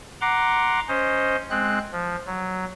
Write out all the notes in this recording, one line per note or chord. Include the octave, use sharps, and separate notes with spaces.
F#5 A#5 C6 D6
C#4 C5 D#5
G#3 C4 F#6
F3
F#3